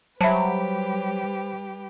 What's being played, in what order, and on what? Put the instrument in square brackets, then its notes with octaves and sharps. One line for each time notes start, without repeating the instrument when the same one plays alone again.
[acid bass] F#3 [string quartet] G3 G4 B4 [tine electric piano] C5 B5 [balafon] E5 A5